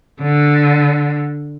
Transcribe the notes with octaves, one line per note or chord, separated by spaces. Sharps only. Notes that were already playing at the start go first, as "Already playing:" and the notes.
D3